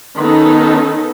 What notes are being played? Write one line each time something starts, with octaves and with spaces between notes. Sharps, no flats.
D#3 B3 C#4 D#4 A4